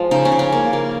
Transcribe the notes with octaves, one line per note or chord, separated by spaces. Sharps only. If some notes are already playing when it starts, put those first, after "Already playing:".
Already playing: F3 G#3
C#3 D#4
C#4
C#3
C#4
A#3
A#3